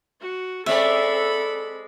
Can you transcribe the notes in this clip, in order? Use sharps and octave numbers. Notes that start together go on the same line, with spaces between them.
F#4
G#3 C4 A4 D5 E5 B5